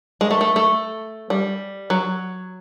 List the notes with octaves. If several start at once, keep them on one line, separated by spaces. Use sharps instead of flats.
G#3
A3
A3
A3
G3
F#3